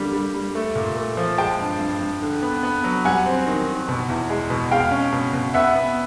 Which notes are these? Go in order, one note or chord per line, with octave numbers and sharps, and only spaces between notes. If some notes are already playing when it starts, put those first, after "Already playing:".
Already playing: D3 G3 A#3
G3
G3
A3
A#2
A3
F3
G#3 G5 A5
G2
G2
G2
D3
B3
B3
F#3
G3 F#5 G#5
C4
D#3
D#3
B2
E2
G#3
B2
G#3 F5 G5
C#4
B2
B2
B3 E5 F#5
B3